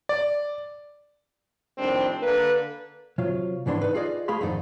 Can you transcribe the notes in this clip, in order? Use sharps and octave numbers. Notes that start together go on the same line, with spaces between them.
D5
F2 A2 D#3 G3 C4 D4
D3 A#3 A4 B4
C3 F#3 F4
C2 G#2 E3 D4 F#5 C6
D#4 B4
F4 G#4 D5 D#5
A3 G#4 F5 B5 C6
F2 G#2 D#3 D#4 C5 D5